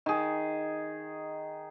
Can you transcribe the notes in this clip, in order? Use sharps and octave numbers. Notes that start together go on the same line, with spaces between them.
D#3 G#4